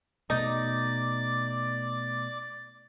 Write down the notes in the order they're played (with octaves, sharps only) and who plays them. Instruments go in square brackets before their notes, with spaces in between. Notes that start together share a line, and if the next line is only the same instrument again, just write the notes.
[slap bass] B2 A3 [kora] D#4 [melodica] D5 D6